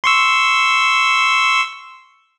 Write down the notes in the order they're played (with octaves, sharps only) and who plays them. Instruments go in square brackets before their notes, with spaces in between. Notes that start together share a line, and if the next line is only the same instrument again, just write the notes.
[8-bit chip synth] C6 C#6 E6